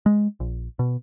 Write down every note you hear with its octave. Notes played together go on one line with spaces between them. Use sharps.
G#3
A#1
B2